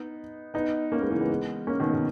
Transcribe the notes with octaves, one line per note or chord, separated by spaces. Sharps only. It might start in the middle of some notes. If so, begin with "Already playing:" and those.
Already playing: B3 D#4
B3 D#4
A#3 C#4
G#3 B3
C#3 E3
G#3 B3
A#3 C#4
B2 D#3
B2